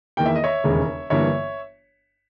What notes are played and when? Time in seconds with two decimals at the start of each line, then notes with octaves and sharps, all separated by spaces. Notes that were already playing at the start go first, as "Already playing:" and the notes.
0.17 E2 D#3 A#3 G5
0.26 E5
0.35 D#5
0.44 C#5 E5
0.64 E1 D#2 C#3 G#3
1.10 G1 G2 E3 A#3 C#5 E5